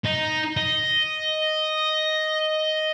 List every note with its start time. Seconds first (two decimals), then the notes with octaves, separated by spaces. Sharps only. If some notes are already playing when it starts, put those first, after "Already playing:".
0.05 D#4
0.57 D#5